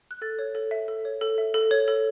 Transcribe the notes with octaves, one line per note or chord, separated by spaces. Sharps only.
F#6
A4 A6
C#5
A4
E5
A4
C#5
A4
E5
A4
C#5
A4